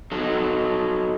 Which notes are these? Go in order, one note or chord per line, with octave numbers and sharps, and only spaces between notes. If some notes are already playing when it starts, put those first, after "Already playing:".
F#3 D#4 A4